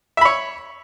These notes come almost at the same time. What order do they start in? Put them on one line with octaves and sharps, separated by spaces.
E5 B5 C#5